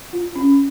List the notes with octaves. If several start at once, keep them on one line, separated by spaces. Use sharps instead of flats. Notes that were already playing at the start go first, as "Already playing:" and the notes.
F4
C#4